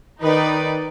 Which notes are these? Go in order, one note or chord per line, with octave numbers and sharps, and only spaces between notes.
D#3 D#4 B4 D5